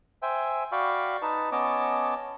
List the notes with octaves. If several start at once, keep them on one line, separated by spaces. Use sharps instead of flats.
C5 E5 G5 G#5
F#4 D5 F5 G5 B5 C#6
D#4 B4 A5
B3 C#4 C#5 D#5 A5 D6